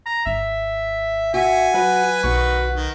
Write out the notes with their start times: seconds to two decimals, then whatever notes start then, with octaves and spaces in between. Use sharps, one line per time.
0.06 A#5
0.26 G#1 E5
1.34 F#4 E5 G#5
1.74 F#3 B4
2.24 B1 D#3 F#4 C#6
2.75 D#3